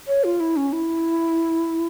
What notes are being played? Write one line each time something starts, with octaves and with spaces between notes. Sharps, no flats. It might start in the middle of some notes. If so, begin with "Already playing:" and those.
C#5
F4
E4
C#4
E4